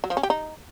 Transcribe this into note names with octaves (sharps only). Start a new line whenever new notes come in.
F#3
F3
C#4
G4
D#4